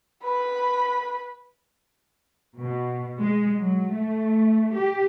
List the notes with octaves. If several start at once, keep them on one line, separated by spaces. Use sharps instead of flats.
B4 B5
B2
G#3
F#3
A3
G4